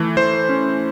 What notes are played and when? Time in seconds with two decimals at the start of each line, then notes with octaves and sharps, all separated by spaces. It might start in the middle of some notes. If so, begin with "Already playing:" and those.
Already playing: E3 A3
0.17 E3 C5
0.49 C#4